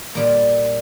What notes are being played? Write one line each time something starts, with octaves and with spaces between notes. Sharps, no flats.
A#2 G3 A#3